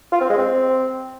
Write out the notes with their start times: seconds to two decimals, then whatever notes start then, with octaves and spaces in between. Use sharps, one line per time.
0.12 F4
0.21 C4
0.29 G#3
0.38 C4